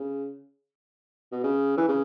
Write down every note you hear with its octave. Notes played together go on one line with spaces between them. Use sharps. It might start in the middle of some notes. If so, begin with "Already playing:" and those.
Already playing: C#3
B2
C#3
E3
C#3